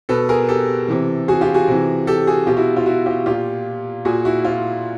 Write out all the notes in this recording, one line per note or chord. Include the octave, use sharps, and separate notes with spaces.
B2 A4 B4
G#4 A#4
G4 A4
C3 E3
F#4 G#4
F4 G4
F#4 G#4
C3 E3
G4 A4
F#4 G#4
B2 F4 G4
E4 F#4
F4
E4 F#4
F4 G4
A#2 F4 G4
A#2 F#4 G#4
E4 F#4
F4